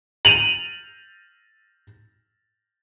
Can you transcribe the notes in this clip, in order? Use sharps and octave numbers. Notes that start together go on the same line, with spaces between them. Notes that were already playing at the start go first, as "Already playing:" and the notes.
D#7 F7 F#7